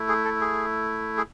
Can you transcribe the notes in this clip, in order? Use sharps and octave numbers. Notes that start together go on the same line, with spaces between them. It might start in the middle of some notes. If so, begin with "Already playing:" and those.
Already playing: A3 E4
G#4
A4
G#4
G#4